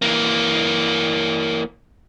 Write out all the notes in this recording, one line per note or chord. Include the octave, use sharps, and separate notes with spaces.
E3 A#3